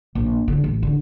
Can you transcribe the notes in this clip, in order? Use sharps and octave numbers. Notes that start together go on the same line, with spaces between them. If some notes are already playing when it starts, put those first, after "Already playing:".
A#1
D3
A1
D3